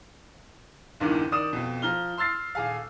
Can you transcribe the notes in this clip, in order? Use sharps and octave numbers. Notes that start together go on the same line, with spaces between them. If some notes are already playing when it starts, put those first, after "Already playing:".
F#1 E2 G2 D#3 E3
D#3 D5 D#6 E7
F2 B2
F3 A#5 F6 G7
C6 E6 F6 A6 C7
D#1 G#4 F5